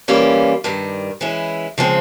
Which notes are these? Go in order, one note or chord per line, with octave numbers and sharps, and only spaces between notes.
E3 G3 A#3 C#4 F4
G2 D#3 G3
E3 G#3 C#4 E4
C#3 F3 G#3 C4